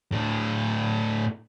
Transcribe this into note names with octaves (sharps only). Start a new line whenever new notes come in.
A2 D4